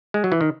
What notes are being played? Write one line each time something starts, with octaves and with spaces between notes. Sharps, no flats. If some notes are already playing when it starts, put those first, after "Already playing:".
G#3
F#3
E3
D#3